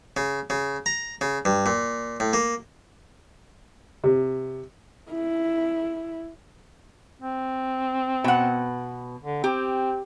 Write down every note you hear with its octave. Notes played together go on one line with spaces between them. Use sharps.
C#3
C#3
A#5
C#3
G2
A#2
A2
A#3
C3
E4
C4
B2 F#5
D3
C4 G4